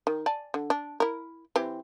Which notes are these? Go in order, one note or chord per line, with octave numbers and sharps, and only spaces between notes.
D#3
D5 G#5 A5
D3
D4
E4 A#4
E3 C4 G4